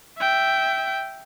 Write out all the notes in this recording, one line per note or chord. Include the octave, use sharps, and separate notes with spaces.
E5 G5